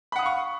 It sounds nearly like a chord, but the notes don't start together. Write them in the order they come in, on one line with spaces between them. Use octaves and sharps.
B5 F#5 D#6 F5 C#6